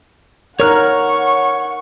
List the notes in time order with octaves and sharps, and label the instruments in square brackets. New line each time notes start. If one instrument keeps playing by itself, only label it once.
[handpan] D#4 A#4 [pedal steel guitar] C#5 F6 F#6 [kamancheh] F#5 C#6